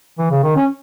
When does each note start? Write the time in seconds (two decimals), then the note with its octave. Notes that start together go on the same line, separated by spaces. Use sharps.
0.19 E3
0.31 C#3
0.43 D#3
0.56 C#4